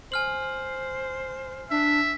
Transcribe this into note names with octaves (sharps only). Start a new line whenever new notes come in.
C5 G#5 F6 F#7
D4 E5